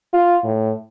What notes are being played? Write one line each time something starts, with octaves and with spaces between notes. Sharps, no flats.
F4
A2